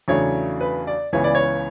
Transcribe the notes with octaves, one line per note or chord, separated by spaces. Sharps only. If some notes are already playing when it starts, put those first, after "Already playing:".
E2 C#3 F#3 A3 D4 C#5
B4
D5
C#2 C#3 E3 B3 C#5
D5
C#5